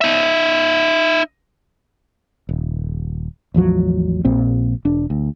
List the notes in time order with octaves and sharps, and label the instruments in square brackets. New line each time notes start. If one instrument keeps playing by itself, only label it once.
[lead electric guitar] D#4 E5
[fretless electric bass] D#1
A1 E2 F3 F#3
A#1 A#2 C4
E1 D4
D2